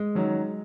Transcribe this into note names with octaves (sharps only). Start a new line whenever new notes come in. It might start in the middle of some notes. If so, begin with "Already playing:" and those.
Already playing: G#3
D#3 F#3 C#4